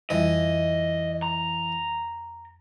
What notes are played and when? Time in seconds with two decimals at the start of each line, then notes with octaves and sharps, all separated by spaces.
0.10 F2 E3 G3 D#5 E5
1.22 A#5